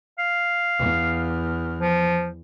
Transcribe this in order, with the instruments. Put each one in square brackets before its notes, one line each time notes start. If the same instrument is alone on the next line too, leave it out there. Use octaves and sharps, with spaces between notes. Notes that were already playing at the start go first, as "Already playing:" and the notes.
[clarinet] F5
[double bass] E2
[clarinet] F3